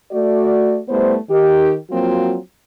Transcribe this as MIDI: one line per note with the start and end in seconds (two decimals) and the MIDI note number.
0.12 0.78 57
0.12 0.78 66
0.12 0.78 74
0.89 1.16 55
0.89 1.16 57
0.89 1.16 59
0.89 1.16 64
0.89 1.16 72
1.30 1.76 51
1.30 1.76 67
1.90 2.36 53
1.90 2.36 54
1.90 2.36 58
1.90 2.36 60
1.90 2.36 65
1.90 2.36 66